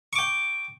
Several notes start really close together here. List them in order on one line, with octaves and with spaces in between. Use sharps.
C#6 D6 G5